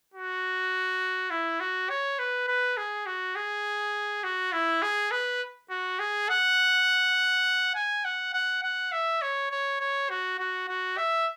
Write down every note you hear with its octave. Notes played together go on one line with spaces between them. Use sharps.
F#4
E4
F#4
C#5
B4
B4
G#4
F#4
G#4
F#4
E4
G#4
B4
F#4
G#4
F#5
G#5
F#5
F#5
F#5
E5
C#5
C#5
C#5
F#4
F#4
F#4
E5